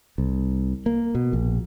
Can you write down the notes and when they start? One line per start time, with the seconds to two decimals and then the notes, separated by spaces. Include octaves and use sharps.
0.18 C2
0.86 A#3
1.15 B2
1.33 A#1